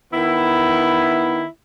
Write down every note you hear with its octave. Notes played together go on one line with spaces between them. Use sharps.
D#3 B3 E4